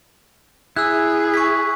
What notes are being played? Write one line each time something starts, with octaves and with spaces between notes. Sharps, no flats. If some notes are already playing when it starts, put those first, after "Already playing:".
E4 G#4 E6 F#6
C#6 B6